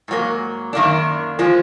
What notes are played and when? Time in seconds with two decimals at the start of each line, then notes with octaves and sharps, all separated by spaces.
0.08 G#2 F#3 A#3
0.73 F#2 D#3 A#3 D4
1.39 F3 G#3